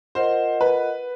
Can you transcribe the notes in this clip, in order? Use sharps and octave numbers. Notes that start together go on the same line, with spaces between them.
F4 A#4 C5 D#5 F#5
B4